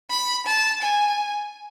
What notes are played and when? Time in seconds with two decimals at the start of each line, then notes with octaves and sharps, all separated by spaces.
0.10 B5
0.46 A5
0.82 G#5